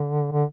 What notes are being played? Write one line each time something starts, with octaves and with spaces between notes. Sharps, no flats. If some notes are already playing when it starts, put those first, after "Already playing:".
Already playing: D3
D3